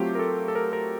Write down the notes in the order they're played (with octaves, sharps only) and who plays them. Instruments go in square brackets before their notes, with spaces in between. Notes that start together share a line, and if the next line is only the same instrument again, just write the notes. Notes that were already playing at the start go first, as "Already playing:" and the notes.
Already playing: [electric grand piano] F#3 A3 C4 F4 G4
A#4
A4
A4
A#4
A#4